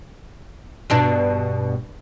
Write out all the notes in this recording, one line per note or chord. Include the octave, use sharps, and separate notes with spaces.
G2 B2 D4